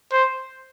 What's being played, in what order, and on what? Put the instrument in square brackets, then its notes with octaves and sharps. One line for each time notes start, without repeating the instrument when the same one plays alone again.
[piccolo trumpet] C5